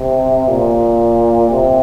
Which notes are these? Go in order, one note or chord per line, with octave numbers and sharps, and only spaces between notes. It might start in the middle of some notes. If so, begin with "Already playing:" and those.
Already playing: C3
A#2
C3